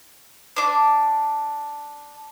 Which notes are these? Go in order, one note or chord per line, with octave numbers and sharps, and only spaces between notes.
D4 D6